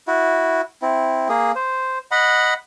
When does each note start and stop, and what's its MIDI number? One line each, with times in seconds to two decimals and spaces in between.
0.07 0.61 64
0.07 0.61 66
0.82 1.28 60
0.82 1.28 64
1.29 1.52 58
1.29 1.52 68
1.55 1.98 72
2.11 2.54 75
2.11 2.54 78
2.11 2.54 83